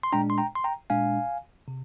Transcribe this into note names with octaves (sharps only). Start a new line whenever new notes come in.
C6
A#2 G#3 D4 G5 A#5
C6
G5 A#5
C6
G5 A#5
A#2 G#3 D4 F5 G#5
C3